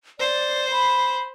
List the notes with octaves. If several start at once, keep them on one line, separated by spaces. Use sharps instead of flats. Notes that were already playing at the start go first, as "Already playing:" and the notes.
C5 D5
B5